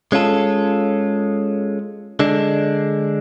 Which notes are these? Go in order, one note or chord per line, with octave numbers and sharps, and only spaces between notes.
G#3 C#4 F4 A4
D3 G#3 D4